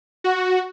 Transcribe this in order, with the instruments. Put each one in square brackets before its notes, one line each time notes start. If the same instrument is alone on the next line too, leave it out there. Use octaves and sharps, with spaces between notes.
[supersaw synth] F#4